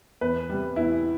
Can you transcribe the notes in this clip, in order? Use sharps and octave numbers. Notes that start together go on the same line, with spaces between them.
E2 B4
C3 G3
E2 E4